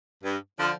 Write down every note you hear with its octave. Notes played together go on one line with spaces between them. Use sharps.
G2
D3 F3